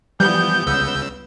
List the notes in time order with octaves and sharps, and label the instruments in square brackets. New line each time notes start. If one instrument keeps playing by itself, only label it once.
[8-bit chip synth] E3 F3 [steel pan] G3 [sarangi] B3 [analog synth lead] G6
[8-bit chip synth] C#2 C#3 E6